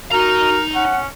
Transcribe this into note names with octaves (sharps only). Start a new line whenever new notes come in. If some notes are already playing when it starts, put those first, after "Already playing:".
D#4 F#4 A#4 A#5
C#4 F#5